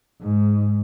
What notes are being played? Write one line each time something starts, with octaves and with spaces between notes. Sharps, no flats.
G#2